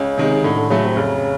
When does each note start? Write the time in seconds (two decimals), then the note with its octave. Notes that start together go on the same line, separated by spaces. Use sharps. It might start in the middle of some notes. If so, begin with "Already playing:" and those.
Already playing: C#2 C#3
0.17 C3 D#3 G#3
0.44 A2 D3
0.57 D3
0.69 C#3 F#3 A3
0.83 C3
0.96 F1 C#3